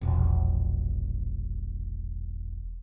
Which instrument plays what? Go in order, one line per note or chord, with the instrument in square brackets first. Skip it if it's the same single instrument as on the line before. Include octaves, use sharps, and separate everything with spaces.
[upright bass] E1 A#1